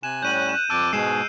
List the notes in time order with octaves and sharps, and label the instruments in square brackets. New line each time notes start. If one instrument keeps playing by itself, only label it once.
[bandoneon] C3 G#5 F#6 [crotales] E7
[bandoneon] A2 G3 C#4 [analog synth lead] F#6 [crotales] G6 D#7 F#7
[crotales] E7
[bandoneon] F2 A5 [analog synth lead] D6 [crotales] E6 F#6 D7
[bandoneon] G#2 B2 G#4 [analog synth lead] G#3 [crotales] C7 E7